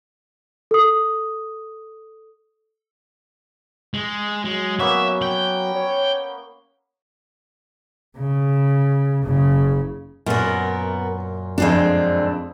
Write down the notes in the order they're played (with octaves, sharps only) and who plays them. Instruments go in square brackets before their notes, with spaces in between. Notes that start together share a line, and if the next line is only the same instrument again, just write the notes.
[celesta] A4 D#6
[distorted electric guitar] G#3
[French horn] F#3 [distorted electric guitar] G#3
[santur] A#3 B3 C#4 [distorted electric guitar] E5
[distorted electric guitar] G5
[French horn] C#5
[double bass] C#3
F#1 C#3
[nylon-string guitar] F#2 A#2 [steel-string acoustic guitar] B3 A#4
[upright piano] F2 D3 [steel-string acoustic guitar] G#3 C4 D4